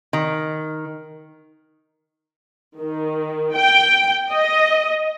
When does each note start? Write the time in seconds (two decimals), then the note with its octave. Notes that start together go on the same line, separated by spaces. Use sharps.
0.13 D#3
2.78 D#3
3.56 G5
4.30 D#5